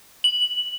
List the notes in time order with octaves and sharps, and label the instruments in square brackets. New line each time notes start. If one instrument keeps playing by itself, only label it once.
[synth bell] F#7